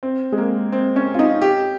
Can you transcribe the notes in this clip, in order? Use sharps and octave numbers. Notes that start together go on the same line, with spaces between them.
C4
G#3
A#3
C4
C#4
F4
D#4
G4